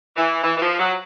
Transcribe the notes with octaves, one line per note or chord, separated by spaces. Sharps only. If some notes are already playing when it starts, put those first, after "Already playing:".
E3
E3
E3
F3
F#3